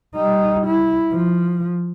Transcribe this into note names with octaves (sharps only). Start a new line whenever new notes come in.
G3 D#4
E4
F3